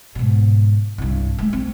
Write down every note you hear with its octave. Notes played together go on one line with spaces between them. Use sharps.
G#2 B2
C2 G2
G#3 A3
C4